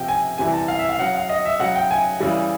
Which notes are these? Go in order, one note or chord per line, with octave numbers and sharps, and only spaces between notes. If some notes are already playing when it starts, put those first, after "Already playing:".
Already playing: C3 F3 G5
G#5
C3 E3 G3 G#5
A5
F5
E5
F5
C#3 F#3 F#5
F5
D#5
E5
C#3 F#3 F#5
G5
G#5
C#3 E3 G3